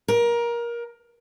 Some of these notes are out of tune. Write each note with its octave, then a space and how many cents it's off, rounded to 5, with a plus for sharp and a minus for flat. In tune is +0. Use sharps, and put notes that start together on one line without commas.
A#4 +20